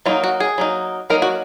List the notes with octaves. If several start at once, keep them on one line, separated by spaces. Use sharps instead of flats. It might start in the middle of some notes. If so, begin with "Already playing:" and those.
F#3 A#3 D#4 F4
F#4
G#4
F#3 A#3 D#4
F#3 A#3 D#4 A#4
F#4